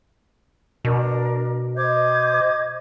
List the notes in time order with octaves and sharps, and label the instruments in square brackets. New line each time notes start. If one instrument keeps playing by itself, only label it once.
[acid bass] B2 [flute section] D4 A#4
[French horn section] C5 D#5 [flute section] D6 G6 G#6